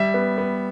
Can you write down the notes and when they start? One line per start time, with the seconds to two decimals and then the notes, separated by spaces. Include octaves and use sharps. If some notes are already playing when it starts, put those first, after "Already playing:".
Already playing: G3 E5
0.14 B3
0.38 B3